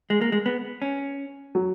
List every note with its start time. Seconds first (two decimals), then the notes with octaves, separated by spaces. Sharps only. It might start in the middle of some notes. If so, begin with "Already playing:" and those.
0.10 G#3
0.21 A#3
0.32 G#3
0.46 B3
0.82 C#4
1.55 F#3